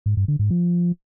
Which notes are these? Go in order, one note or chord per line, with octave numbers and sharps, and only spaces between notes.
G#2
G2
D3
G#2
F3